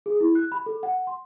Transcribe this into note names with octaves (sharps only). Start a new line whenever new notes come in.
G#4
E4
F#6
B5
A4
F#5
C6